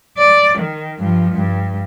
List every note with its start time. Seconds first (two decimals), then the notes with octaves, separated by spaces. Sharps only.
0.18 D5
0.58 D#3
0.99 G2 F3
1.33 G2